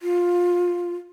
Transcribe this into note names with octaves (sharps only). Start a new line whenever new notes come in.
F4